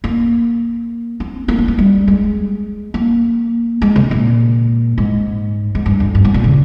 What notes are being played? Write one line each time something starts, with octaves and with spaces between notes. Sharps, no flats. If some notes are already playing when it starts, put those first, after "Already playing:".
A#3
C4
A#3
C4
A#3
G3
G#3
A#3
G#3
C3
A#2
G#2
G#2
G2
F2
G2
G#2
A#2
C#3